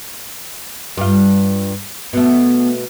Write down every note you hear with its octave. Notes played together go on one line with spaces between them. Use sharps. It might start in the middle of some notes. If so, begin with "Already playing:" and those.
G2 F4
B2 A3 B3